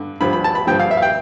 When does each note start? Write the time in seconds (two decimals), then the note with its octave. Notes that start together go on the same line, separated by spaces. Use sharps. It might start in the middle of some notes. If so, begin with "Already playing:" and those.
Already playing: G2 D3
0.21 G2 D3 F3 B5
0.33 B5
0.44 A5
0.55 B5
0.67 G2 D3 F3 G5
0.79 F5
0.91 E5
0.97 F5
1.02 G5